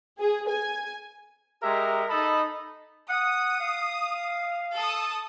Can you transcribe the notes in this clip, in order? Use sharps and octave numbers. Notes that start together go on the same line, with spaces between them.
G#4
G#5
G#3 G4 A#4 E5 A#5
D#4 A4 D#5 A5 B5
F#5 D#6
F5
A4 A5 D#6